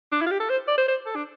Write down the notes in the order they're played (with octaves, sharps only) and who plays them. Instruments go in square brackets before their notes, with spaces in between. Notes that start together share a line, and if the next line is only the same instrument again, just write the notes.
[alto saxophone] D4
E4
F4
G4
A4
C5
D5
C5
C5
A4
D4